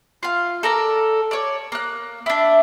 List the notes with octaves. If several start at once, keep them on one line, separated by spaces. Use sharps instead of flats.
F4 F5
A4 A#4 D5 A#5
C#5 D5
A#3 F#6
D4 E4